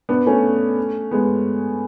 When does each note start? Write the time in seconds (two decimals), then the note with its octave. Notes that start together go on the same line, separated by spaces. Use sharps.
0.09 B3 D4
0.26 A3 C#4
1.11 G#3 B3